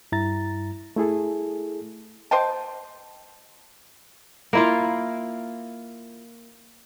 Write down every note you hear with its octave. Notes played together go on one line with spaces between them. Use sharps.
G2 E4 A#5 A6
A3 E4 G#4 A4
C5 D#5 G5 A5
A#3 E4 F4